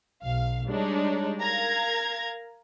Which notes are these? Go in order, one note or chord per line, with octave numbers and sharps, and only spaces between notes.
B1 F5
G3 G#3 D4 D#4 C#5
A#4 F5 A#5 G#6